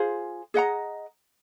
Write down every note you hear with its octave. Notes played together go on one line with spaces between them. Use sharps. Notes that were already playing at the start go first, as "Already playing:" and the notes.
Already playing: F4 G#4 C5
G#4 D#5 F#5 A#5